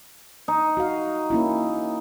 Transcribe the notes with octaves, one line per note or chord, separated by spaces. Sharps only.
D#4
F#4 F5
A#3 C#4 E4